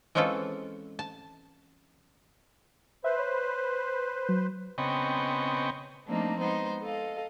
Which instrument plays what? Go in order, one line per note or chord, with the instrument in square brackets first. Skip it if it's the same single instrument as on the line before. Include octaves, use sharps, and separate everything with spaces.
[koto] E3 G#3 C4 C#4 F4 A4
A5
[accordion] B4 C5 [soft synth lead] E5
[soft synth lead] C#5
F#3
[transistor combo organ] C#3 B3 C4 D#5 G5 C#6
[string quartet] F3 A3 A#3 C4 D4 D#4
G#3 B3 D#4 C5
A4 D#5 F5